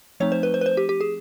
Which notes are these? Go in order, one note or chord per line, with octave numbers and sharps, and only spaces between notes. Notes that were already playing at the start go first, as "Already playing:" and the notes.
F3 A3 C4 D#4 C#5
C5
B4
C5
B4
C5
G4
G4
G#4